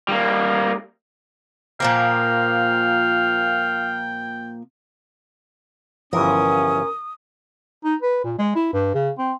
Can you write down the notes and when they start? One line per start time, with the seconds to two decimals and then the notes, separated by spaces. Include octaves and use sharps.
0.09 G3 A#3
1.80 A#2 F3 A#3 F5 G5
6.13 G1 E3 F3 C#4 A#4 D#6
7.84 D#4
8.02 B4
8.24 A#2
8.39 G#3
8.55 E4
8.73 G2
8.94 C#3
9.18 C4